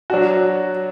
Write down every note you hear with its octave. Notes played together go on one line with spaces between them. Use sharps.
F#3 D4 F#4